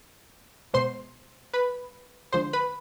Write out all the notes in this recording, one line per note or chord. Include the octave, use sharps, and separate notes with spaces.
B2 G#3 C5 C6
B4 B5
D3 F3 G#3 C5 C6
B4 B5